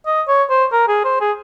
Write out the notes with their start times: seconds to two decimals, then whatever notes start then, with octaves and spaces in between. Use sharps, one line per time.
0.06 D#5
0.28 C#5
0.50 C5
0.72 A#4
0.88 G#4
1.04 C5
1.21 G#4